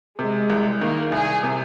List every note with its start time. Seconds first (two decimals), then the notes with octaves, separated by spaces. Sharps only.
0.19 C3 G#3
0.50 C2
0.81 D#3 A#3
1.12 C2 G#4
1.43 C3